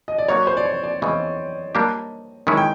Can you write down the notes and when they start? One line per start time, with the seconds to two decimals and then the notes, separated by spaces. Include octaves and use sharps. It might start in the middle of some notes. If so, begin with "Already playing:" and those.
0.08 D#5
0.18 D5
0.28 F#3 A#3 D#4 F#4 C#5
0.47 C5
0.57 D5
0.65 C#5
0.83 D5
1.02 E2 C#3 E3 D#5
1.75 G3 A#3 D4 G4
2.47 D#3 G#3 C#4 E4
2.57 G5